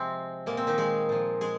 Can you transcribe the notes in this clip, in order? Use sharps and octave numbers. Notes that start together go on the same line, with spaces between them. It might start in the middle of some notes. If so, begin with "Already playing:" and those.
Already playing: C3 F3 G#3 C4
A#2 G#3 A#3
C4
D#3 D#4
G#3 G#4
A#2 F3 G#3
G#3 G#4